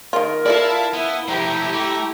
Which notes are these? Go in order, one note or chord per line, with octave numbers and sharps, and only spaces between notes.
D#3 F4 A#4
E4 F4 A4 D5 F5 A5
B3 E4
F3 A3 E4 G4 A#5
A3